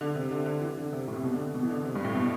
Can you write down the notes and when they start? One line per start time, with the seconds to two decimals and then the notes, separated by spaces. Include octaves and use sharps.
0.01 D3
0.15 C3
0.31 D3
0.46 D3
0.61 E3
0.78 D3
0.93 C3
1.08 A2
1.17 C3
1.23 B2
1.33 D3
1.54 B2
1.63 E3
1.69 D3
1.84 C3
1.95 G2
2.05 A2
2.14 B2